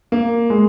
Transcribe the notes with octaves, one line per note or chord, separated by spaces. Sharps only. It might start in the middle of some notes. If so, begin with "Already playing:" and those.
A#3
G#3